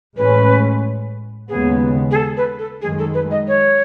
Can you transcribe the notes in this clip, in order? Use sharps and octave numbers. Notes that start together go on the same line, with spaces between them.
A1 A2 G#3 C#4 B4
D#2 C#3 G#3 B3 G#4
G#4
A4
B4
A4
F#2 D#3 G#3 G#4
A4
B4
D#5
C#5